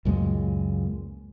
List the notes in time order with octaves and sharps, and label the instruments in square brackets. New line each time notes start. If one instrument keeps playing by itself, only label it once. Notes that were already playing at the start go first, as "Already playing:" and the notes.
[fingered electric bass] C#2 F#2 A#2 G#3